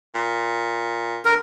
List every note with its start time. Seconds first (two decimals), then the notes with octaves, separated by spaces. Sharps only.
0.15 A#2
1.25 D3 A#4